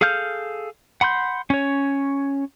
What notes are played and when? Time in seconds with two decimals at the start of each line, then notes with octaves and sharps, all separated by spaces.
0.01 G#4 A4 F5 F6 G6
1.01 F#5 B5 C6 G6
1.50 C#4 C#5